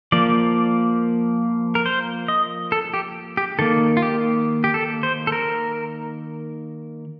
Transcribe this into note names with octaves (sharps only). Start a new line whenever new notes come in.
F3 A#3 D5
A#4
C5
D#5
A4
G4
G4
D#3 A#3 A4
F4
G4
G4
A4
C5
A4
A#4